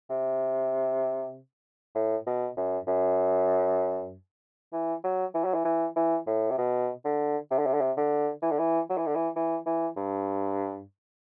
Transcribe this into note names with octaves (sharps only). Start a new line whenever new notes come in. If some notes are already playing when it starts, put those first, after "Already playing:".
C3
A2
B2
F#2
F#2
E3
F#3
E3
F#3
E3
E3
E3
A2
C3
B2
D3
C3
D3
C3
D3
C3
D3
E3
D3
E3
F#3
E3
D3
E3
E3
E3
G2